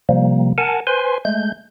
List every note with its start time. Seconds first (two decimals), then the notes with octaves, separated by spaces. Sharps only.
0.09 C3 F3 G3 A#3
0.58 A#4 F#5 G#5 A5
0.87 B4 C5 G#5 C6
1.25 G#3 A3 G6